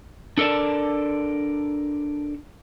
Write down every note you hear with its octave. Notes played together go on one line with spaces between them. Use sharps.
D4 A4 A#4 D5 A5